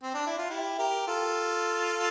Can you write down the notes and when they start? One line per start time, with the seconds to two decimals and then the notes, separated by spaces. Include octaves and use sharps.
0.03 C4
0.14 D4
0.27 E4
0.38 F4
0.50 E4 G4
0.79 G4 A#4
1.07 F4 A4